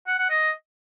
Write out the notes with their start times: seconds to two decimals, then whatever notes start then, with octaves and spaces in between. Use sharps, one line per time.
0.07 F#5
0.19 F#5
0.30 D#5